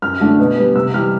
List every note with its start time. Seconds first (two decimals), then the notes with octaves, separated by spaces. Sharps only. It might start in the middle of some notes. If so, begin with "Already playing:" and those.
0.02 F#2 F6
0.20 D3 F#3 A3 D4
0.39 B2
0.57 G3 B3
0.76 C3 E6
0.94 E3 G3 F6